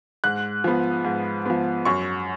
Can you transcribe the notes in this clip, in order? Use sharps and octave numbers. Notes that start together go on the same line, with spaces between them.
G#2 F#6
F3 B3
G#2
F3 B3
F#2 C#6